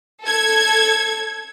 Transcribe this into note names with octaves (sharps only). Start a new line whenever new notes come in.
A4 G#6